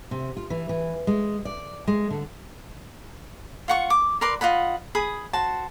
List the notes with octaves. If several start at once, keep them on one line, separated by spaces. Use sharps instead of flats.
C3
F4
E3
E3
G#3
D5
G#3
D3
F4 F#5 C#6
D6
A#4 B4 D5 C6
F4 D#5 F#5 B5
G#4 B5 D#6
F#4 C5 A5